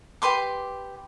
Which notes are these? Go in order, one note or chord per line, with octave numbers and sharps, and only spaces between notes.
G4 B4 C6 D6